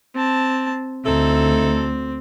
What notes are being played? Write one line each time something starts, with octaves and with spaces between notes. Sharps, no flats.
C4 A5
D2 C4 D#4 E4 A4